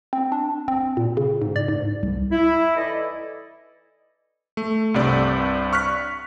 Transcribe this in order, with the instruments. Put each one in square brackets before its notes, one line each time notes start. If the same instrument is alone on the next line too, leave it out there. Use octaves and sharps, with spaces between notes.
[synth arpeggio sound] C4
D4
C4
A#2
C#3
G#2
D5
G#2
C2
[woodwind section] E4
E3 D#4 E4 A4 D5 D#5
[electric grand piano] A3
C2 G2 C3 D5
C#6 F6 F#6 B6